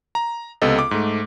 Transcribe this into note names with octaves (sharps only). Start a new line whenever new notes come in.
A#5
C#2 C3 B3 A4 D#5
D6
G#2 A3